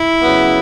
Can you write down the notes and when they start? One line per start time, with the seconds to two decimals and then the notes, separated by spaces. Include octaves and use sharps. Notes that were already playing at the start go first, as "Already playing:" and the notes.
Already playing: E4
0.20 C#3 F#3 B3